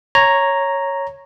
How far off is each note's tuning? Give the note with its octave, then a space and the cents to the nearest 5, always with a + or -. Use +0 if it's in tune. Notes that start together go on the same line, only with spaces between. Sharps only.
C#5 -5 A#5 +0